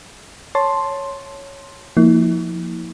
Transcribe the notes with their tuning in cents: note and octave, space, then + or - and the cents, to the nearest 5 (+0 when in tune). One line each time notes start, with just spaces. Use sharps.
C#5 +0 A5 +0 C6 +5
F3 +0 A#3 +0 E4 -40